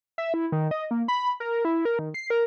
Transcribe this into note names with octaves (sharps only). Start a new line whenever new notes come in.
E5
E4
D#3
D#5
A#3
B5
A#4
E4
A#4
D#3
C7
A#4